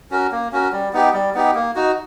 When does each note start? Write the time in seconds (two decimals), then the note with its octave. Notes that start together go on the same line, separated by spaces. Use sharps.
0.11 C#4 F#4 A#4
0.32 A#3
0.52 C#4 F#4 A#4
0.72 G3
0.93 B3 D#4 G4
1.13 G3
1.35 B3 D#4 G4
1.55 A#3
1.75 D#4 F#4